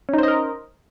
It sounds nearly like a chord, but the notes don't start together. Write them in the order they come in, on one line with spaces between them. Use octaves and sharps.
C#4 D#4 C5 D#5 A#4